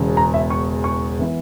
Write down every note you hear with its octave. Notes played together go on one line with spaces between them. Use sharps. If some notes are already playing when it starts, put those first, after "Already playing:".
Already playing: E1 E2 C#3
A#5
E5
C#6
C#6
E3 B3 E4